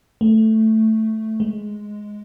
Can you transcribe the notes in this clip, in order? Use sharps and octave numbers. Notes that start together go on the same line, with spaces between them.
A3
G#3